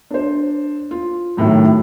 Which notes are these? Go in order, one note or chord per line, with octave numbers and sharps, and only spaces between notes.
D4 C5
F4
F#2 A2 C3 D#3 F#3